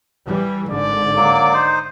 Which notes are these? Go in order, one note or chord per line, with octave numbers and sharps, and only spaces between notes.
E3 G3
G#1 G#2 D3 D5
F#3 A#3 D6
D#4 C5